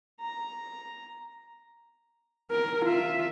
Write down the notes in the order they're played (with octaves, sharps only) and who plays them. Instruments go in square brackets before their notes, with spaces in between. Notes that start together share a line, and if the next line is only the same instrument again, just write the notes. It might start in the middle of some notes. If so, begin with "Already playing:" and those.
[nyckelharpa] A#5
[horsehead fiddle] A#4
F4 E5